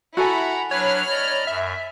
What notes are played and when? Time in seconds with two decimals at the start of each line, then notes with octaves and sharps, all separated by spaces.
0.17 E4 F#4 A4 F#5 G#5 A#5 B5
0.71 F#3 D4 B4 C#5 B5 F6
1.10 D5 D#5 A#5
1.47 F#2 E5